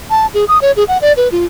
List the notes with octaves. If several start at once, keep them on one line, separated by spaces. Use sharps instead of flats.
A5
G#4
D#6
C#5
G#4
F#5
D5
B4
F4